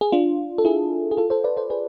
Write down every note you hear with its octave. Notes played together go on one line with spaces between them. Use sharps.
G#4
D4 F4
A4
E4 G#4
G#4
F4 A4
A4 C5
B4 D5
A4 C5
G#4 B4